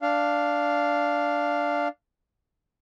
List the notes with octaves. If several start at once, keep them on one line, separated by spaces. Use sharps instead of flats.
D4 F5